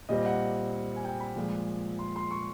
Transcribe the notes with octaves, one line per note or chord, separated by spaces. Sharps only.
A#2 G3 C4 D#5
F#5
G#5
G5
B5
A#2 F3 G#3
C6
C6
C#6